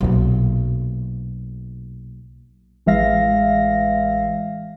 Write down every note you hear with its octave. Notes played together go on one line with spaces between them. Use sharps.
B1 A#2
A1 E3 G#3 E5 F5 A#6